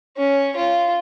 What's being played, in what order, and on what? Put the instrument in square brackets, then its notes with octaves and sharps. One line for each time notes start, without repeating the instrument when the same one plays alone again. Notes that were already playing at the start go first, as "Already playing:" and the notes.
[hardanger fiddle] C#4
F4